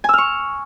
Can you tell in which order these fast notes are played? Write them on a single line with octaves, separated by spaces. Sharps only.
G#5 E6 F6 C#6